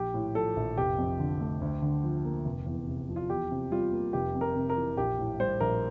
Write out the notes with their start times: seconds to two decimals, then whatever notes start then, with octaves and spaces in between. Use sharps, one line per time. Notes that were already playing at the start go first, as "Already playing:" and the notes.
Already playing: A#1 G4
0.14 A2
0.35 F3 A4
0.56 A#1
0.77 F1 G4
0.98 F2
1.19 D3
1.40 A3
1.61 D2
1.82 D3
2.03 F3
2.25 A#3
2.45 F1
2.66 E2
2.87 C3
3.09 F3
3.16 F4
3.30 E2 G4
3.51 C3
3.72 G3 F4
3.92 A#3
4.13 F1 G4
4.34 F2
4.41 A#4
4.56 C3
4.70 A#4
4.77 E3
4.97 A#1 G4
5.18 A2
5.40 G3 C5
5.60 A#1 A#4